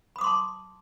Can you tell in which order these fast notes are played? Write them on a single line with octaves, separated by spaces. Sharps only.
B5 D#6 D6 C6 A5